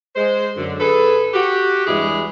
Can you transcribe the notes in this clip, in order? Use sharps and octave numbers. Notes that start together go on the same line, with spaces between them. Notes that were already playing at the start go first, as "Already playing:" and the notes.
G#3 C5
F#2 D3
G#4 A4 B4
F#4 G4
E2 G2 G#3 E4 G4 G#4